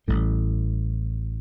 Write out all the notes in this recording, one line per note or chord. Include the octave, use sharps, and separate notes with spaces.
A1 A2 G3